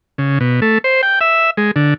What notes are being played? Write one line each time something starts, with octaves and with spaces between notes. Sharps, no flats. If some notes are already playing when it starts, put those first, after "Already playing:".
C#3
B2
A3
C5
G5
E5
G#3
D3